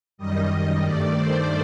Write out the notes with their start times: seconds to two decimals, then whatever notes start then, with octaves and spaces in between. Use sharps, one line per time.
0.18 F#2 D#3 G3 D#5
0.82 G2 D#3 A3 D5
1.14 C5